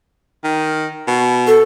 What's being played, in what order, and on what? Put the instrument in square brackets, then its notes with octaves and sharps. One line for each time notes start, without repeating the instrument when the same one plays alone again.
[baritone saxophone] D#3
B2
[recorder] A4